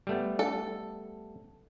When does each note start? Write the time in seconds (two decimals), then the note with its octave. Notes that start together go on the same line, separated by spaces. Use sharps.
0.07 G3 A3 B3
0.39 A4